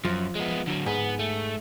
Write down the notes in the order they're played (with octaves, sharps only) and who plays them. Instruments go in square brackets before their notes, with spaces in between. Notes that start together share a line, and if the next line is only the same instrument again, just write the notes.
[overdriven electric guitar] F#2 [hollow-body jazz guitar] F3
[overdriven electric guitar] G#3 B3
D3 F#3
[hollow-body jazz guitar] G#2 [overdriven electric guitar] B3
[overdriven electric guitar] A3